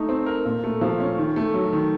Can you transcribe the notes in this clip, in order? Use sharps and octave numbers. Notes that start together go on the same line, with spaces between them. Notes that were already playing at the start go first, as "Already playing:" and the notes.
Already playing: A3 D#4
C4
A#4
A#2
A3
F3
C#4
D#3
A3
F#3
D#3